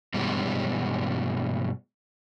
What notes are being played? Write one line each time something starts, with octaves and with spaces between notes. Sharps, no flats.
G2 B2 E3 G3 G#3